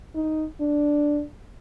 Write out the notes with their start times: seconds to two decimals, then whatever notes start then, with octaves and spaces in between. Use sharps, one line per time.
0.15 D#4
0.61 D4